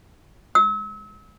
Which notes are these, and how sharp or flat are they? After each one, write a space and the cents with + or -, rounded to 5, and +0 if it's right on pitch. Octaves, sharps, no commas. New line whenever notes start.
E6 -35